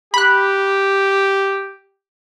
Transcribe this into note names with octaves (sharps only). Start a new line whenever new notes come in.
G4 B5 F#6